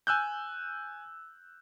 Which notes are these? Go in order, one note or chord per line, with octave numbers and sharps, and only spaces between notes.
G#5 E6 F#6 G6